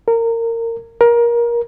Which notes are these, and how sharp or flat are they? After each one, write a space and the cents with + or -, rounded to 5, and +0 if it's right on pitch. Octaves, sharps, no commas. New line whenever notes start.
A#4 -25
A#4 +20